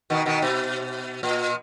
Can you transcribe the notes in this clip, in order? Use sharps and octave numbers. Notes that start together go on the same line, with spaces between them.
B2 D#3
B2 D#3
B2
A#2